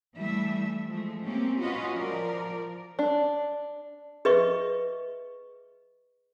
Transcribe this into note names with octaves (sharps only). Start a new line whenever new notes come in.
E3 G3 A3 E5
F3 G#3 A3
A#3 C4 C#4 G4
C#4 F4 F#4 B4 D#5
F3 A#4 D5
D4
G#4 B4 D#5 E5 C#6